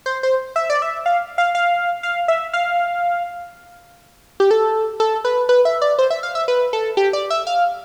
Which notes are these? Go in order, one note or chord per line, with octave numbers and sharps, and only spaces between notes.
C5
C5
E5
D5
E5
F5
F5
F5
F5
E5
F5
G4
A4
A4
B4
B4
E5
D5
C5
E5
F5
E5
B4
A4
G4
D5
E5
F5